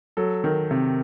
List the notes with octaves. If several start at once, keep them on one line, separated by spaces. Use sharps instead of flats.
F#3 A4
D#3
C3